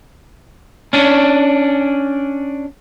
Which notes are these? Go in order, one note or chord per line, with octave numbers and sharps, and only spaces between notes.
C#4 D4